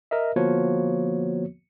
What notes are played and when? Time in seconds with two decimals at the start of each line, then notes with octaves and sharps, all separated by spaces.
0.11 A#4 D#5 E5
0.36 D3 F3 A#3 B3 F#4 C#5